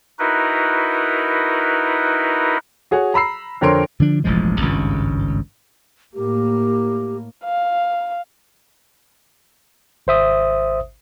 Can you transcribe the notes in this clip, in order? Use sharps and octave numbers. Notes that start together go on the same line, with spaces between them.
D#4 E4 F#4 A#4 B4
F#4 G#4 C#5 F#5
A#5 B5 E6 C7
F2 D3 A#4 C#5 C6 D7
D3 F3 D4
E1 A1 F3 G#3
G#1 C#2 G2
A2 A#3 G4
F5
G#1 C5 E5 D#6